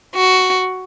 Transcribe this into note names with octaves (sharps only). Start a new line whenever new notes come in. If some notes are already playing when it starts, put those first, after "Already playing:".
F#4